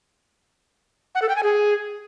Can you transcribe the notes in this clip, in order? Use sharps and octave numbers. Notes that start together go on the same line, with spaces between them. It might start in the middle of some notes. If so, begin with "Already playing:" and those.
F#5
A4
G5
G#5
G#4